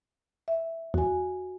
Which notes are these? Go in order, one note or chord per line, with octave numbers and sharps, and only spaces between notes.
E5
E2 F#4 G#5